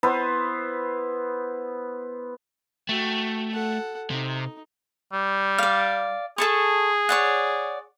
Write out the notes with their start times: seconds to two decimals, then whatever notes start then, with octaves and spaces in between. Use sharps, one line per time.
0.03 B3 E4 B4 C5
2.89 A3 F#4 G5
3.52 A4 F#5
4.10 C3 D#4
5.13 G3
5.58 D5 F5
6.38 G#4 A4 A5 C#6
7.09 C#5 D5 F#5